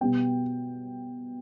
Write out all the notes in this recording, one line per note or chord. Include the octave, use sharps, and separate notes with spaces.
B2 G3 B3 G5